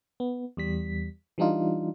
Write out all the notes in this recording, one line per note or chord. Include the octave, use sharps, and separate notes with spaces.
B3
E2 G3 B6
E3 G3 D4 D#4 F4